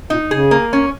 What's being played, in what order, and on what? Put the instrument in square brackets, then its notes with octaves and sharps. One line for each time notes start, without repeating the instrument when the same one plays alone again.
[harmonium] A#2 [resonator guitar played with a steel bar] D#4
[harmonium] C#3 [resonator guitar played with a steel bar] G#4
[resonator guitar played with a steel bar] A#3
C#4